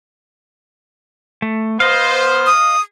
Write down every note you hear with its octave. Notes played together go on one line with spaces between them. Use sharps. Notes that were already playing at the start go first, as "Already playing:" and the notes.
A3
B3 C5 D#5 F5
D#6